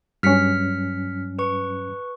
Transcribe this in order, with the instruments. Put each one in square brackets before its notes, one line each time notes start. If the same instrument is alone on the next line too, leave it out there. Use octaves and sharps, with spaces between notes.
[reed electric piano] G2 F#3 C#4 [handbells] F6 B6 C#7
[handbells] B4 C#6